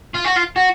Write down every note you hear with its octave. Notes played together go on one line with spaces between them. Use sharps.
F4
F#4
F4
F#4